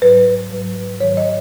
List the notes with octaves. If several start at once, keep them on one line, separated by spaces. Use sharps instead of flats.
G#2 F#3 B4
G#2 F#3
G#2 D#3 F#3 C#5
D#5